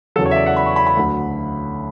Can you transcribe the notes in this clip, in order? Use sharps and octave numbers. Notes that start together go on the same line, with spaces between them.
E2 C#3 F#3 A4
C#5
E5
D5
F#5
B5
C#6
B5
B5
D2 D3 F#3